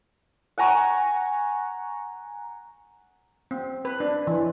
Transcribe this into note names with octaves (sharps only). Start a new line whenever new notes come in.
F#5 G#5 A#5 C#6
C4
B4
D4
E3